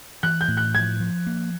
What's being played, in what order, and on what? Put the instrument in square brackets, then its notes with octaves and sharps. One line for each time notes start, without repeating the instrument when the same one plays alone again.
[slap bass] E3 [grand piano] F#6
[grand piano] G6
[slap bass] A2
[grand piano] F#6
[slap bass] F3 [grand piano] G#6
[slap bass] F3
A#3